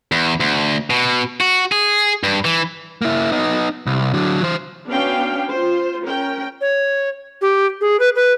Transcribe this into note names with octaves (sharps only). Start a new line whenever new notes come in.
E2
D2
B2
F#4
G#4
G2
E3
A#3 E4
B3 D#4
C2
D3 F#3
E3 C5
B3 C#4 D4 F#4 F5 G5
F4 C5
C#4 A#4 G5
C#5
G4
G#4
B4
B4